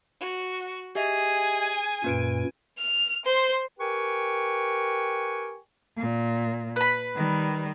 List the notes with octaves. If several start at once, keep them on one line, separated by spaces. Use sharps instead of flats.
F#4
G4 G#4 D#5 E5 G#5
F#2 A#2 A#3 B4 D7
F6
C5
G4 A#4 B4 G5 G#5 C#6
A#2
B4 B5
D#3 G3